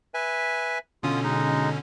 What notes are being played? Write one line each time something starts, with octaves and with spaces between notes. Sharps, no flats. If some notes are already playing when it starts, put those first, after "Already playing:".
B4 E5 G#5
B2 D3 C#4 F4 D#6
G#3 D#4